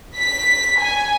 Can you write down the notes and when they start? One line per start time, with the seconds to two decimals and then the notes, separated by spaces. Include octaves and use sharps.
0.17 B6
0.79 G#5